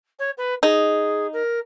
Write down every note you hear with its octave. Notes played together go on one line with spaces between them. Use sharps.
C#5
B4
D#4 G#4
A#4